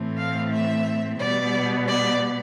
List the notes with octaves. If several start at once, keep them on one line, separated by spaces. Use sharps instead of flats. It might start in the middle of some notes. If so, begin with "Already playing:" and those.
Already playing: A2 E3 A3 C4
F5
E5
B2 G3 B3 D5
D5